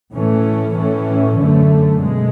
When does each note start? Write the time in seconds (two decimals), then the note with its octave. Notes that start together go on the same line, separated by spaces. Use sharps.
0.13 A2 E3 A3 C#4
0.76 A2 E3 A3 C#4
1.38 F#2 D3 A3
2.00 B2 G#3